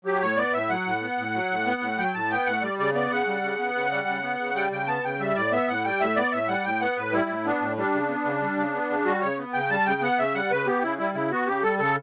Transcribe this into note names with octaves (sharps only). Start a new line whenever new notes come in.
F#3 G4
A2 C#5
B3 D5
A2 E5
F#3 F#5
A2
B3
A2
F#3
A2
B3
A2
F#3 G5
A2 A5
B3 G5
A2 F#5
G3 D5
C#3 D5
B3 D5
C#3 F#5
G3
C#3
B3
C#3
G3
C#3
B3
C#3
G3 G5
C#3 G5
B3 A5
C#3 G5
G3 E5
A2 D5
B3 E5
A2 F#5
G3 G5
A2 E5
B3 D5
A2 E5
G3 F#5
A2 G5
B3 F#5
A2 B4
G3 E4
A2
B3 D4
A2
G3 D4
C#3
B3
C#3
G3
C#3
B3
C#3
G3 F#4
C#3 C#5
B3
C#3 G5
G3 A5
C#3 G5
B3 F#5
C#3 E5
G3 F#5
C#3 B4
B3 G4
C#3 E4
G3 E4
C#3 E4
B3 F#4
C#3 G4
G3 A4
C#3 A4